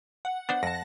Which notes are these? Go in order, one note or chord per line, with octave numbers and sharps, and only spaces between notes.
F#5
B3 D4 C5 F#5
F2 A5 A#6